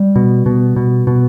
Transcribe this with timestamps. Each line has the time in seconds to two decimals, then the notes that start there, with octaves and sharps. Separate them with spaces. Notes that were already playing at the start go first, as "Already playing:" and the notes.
Already playing: G3
0.16 B2
0.46 B2
0.76 B2
1.07 B2